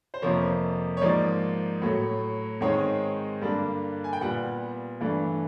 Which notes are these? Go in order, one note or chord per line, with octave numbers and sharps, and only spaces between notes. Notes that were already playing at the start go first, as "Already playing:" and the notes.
C5
F2 C3 F3 A#3 C#5
C#5
G#2 F3 A#3 D#4 D5
A2 F#3 A3
G#2 D#3 G#3 C4 D#4 C#5
G2 D3 G3 A#3 D4
G#5
G5
A#2 G3 B3 F#5
G2 E3 A3 D4